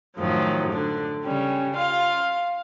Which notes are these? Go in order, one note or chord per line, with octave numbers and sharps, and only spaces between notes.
F#2 A2 D#3 F3 F#3
D3 D4
C#3 G3 C#4
F4 F5